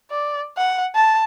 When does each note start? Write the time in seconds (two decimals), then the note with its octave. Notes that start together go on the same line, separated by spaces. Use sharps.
0.11 D5
0.58 F#5
0.95 A5